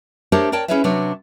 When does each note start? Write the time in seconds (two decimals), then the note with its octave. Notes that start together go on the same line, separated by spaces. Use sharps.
0.32 A3 D4 G4 A#4 C5 C#5
0.52 A#4 C#5 D5 G5 A5
0.68 C#4 E4 G#4 B4 C#5 E5
0.84 C3 F#3 D4 B4 C#5